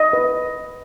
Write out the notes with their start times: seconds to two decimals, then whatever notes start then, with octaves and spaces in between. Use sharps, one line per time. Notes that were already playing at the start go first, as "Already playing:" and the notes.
Already playing: D#5
0.13 B4